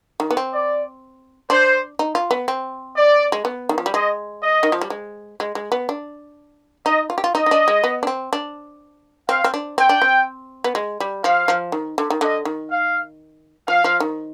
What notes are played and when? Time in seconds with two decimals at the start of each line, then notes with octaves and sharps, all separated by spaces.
0.20 D#3
0.31 B3
0.37 C4
0.53 D5
1.50 D4 C5
1.99 D#4
2.15 F4
2.31 B3
2.48 C4
2.96 D5
3.32 G#3
3.45 B3
3.69 D#3
3.78 F3
3.86 G3
3.94 G#3 D#5
4.42 D#5
4.63 D#3
4.72 F3
4.81 G3
4.90 G#3
5.40 G#3
5.55 G#3
5.72 B3
5.89 D4
6.86 D#4 D#5
7.10 F4
7.18 G4
7.24 F4
7.35 D#4 D#5
7.46 D#4
7.51 D4
7.68 G#3
7.84 B3
8.03 D4
8.07 C4
8.33 D4
9.29 C4 F5
9.44 C4
9.54 D4
9.78 C4 G5
9.89 D4
10.02 C4
10.64 B3
10.75 G#3
11.00 G3
11.24 F3 F5
11.48 F3
11.72 D#3
11.98 D3
12.10 D#3
12.21 D3 D#5
12.45 D#3
12.70 F5
13.68 F3 F5
13.84 F3
14.00 D#3